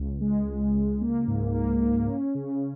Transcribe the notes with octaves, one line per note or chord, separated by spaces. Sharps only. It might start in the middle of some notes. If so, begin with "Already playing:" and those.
Already playing: C#2
G#3
C#2
C#2
A#3
G#2
A#3
A#3
C#4
C#3